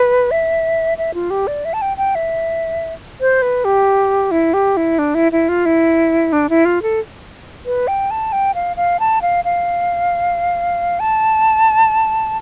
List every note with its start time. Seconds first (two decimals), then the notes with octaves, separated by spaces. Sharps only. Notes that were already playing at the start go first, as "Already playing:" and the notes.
Already playing: B4
0.31 E5
0.98 E5
1.14 F4
1.30 G4
1.47 D5
1.65 E5
1.74 A5
1.82 G5
1.97 G5
2.15 E5
3.21 C5
3.42 B4
3.65 G4
4.31 E4
4.54 G4
4.77 E4
4.99 D4
5.15 E4
5.32 E4
5.49 F4
5.66 E4
6.33 D4
6.50 E4
6.65 F4
6.82 A4
7.66 B4
7.88 G5
8.11 A5
8.32 G5
8.55 F5
8.77 F5
9.00 A5
9.22 F5
9.45 F5
11.00 A5